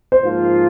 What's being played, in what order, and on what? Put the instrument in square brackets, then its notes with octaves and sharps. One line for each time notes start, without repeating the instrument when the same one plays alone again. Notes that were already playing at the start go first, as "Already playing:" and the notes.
[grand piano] C5
[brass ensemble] G#2 F3 A#3 F4